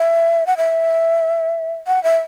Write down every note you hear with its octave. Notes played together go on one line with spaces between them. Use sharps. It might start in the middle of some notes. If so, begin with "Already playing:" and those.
Already playing: E5
F#5
E5
F#5
E5